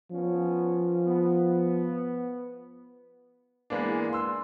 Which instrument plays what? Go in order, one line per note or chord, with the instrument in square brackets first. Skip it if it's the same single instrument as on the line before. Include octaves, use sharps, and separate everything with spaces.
[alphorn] F3 [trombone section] B3 C#4
[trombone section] B3
[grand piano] E3 G#3 A#3 B3 D4
C6 E6